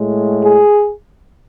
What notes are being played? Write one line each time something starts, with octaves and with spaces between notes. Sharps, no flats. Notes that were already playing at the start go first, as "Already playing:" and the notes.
Already playing: A2 G#3
G#4